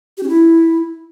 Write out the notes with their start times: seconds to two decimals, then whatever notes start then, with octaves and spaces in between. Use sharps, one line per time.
0.18 G4
0.23 C#4
0.29 E4